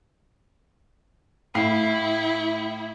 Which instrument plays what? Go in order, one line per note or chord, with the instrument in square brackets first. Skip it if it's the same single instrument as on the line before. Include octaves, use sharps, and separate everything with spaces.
[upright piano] A2 F5 C7 [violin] E4